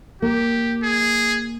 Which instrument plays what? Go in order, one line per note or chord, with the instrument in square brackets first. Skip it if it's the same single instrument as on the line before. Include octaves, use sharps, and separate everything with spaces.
[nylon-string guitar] A#3 [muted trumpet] G4
[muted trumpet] G#4